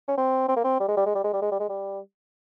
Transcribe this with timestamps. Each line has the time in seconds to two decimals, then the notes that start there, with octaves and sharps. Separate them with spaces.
0.08 C#4
0.17 C4
0.48 C4
0.56 A#3
0.64 C4
0.80 G3
0.88 G#3
0.97 G3
1.06 G#3
1.15 G3
1.24 G#3
1.33 G3
1.42 G#3
1.52 G3
1.60 G#3
1.69 G3